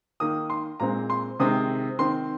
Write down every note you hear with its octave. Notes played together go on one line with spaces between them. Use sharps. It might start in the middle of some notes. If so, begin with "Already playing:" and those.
D#3 A#3 D#6
C6
A#2 G#3 C4 A#5
C6
C3 D#3 G#3 C4 D#6
D#3 C4 C6